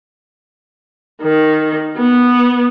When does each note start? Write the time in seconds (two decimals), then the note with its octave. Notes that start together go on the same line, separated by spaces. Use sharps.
1.21 D#3
1.96 B3